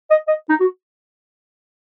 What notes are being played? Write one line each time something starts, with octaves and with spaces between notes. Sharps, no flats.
D#5
D#5
D#4
F#4